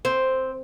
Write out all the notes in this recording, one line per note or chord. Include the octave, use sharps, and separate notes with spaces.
C4